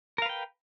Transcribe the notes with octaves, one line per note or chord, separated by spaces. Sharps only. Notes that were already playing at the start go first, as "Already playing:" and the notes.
A#4 B4 F5 G5